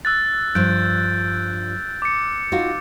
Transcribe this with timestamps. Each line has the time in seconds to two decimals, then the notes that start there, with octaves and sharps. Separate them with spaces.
0.05 E6 F#6 A6
0.55 G2 F3 F#6 G6 D7
2.02 D6 C#7
2.52 D#4 F4 F#4